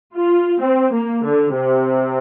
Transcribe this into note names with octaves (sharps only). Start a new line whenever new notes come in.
F4
C4
A#3
D3
C3